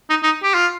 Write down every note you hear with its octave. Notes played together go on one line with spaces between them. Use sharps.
D#4
D#4
G4
F4